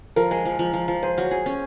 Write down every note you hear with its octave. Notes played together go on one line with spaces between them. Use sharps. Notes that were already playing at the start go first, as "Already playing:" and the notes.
F3 A#4
G#3
F3
F3
F3
F3
G#4 C5
F#3
G#4
C#4